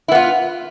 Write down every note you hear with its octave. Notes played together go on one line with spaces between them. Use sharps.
B3 E4 F4